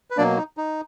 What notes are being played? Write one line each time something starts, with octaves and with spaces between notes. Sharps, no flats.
B4
B2 F#3 A#3 D4 D5
D#4
D#4